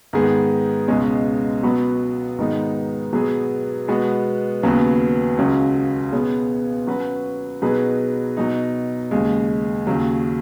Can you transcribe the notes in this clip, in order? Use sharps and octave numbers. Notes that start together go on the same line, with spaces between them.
G#2 D#3 B3 G#4
C#2 B2 G#3 C#4
B2 F#3 B3 F#4 B4
G#2 D#3 G#3 B3 D#4
B2 F#3 B3 G#4
B2 G#3 B3 F#4
D#2 C#3 F#3 B3
C#2 C#3 F#3 C#4 F#4
B2 B3 G#4 C#5
F#3 C#4 F#4 B4
B2 F#3 D#4 G#4 B4
B2 F#3 D#4
D#2 C#3 G#3
D#2 C#3 F#3